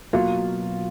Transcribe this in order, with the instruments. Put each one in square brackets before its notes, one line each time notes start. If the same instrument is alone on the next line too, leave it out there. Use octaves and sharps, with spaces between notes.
[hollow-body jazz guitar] B2 F#3 A#3 [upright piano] F4